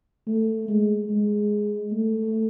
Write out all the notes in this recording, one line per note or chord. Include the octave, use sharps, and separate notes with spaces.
A3
G#3
G#3
A3